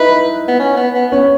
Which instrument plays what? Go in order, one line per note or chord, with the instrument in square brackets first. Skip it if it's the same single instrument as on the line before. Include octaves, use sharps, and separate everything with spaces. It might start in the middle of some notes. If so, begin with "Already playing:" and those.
Already playing: [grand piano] D#4 E4 D#5 E5 [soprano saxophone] B4
[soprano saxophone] B3
C#4
B3
B3
[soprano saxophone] B3 [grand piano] C#4 C#5